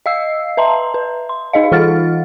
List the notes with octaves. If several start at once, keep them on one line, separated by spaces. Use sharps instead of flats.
D#5 F5 E6 C7
B4 E5 A5 A#5 C6
B4
C6
D#4 G#4 D#5 F5
E3 F4 A4 F#5 F6 A6